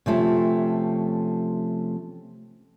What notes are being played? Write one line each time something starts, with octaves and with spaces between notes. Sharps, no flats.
C3 F3 A3 C#4